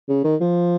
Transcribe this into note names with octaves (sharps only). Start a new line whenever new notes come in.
C#3
D#3
F3